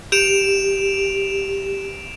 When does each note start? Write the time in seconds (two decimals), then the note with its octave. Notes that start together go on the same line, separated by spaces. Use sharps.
0.12 G4 D7 E7 F7